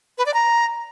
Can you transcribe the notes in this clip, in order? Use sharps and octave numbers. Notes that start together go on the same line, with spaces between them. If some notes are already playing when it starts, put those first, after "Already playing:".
B4
D5
A#5